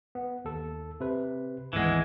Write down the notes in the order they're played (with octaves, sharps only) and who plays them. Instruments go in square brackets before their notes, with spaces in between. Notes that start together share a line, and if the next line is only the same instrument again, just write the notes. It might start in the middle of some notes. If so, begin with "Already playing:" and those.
[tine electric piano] B3
D#2 A4
C3 B4
[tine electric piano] G#1 D2 B3 [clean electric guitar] E3 G#3